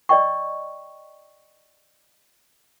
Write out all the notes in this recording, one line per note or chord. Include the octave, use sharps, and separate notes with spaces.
D5 D#5 G5 C#6